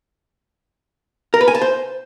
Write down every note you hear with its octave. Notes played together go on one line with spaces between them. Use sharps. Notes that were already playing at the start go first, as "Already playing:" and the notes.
A#4
B4
G#5
A5
C5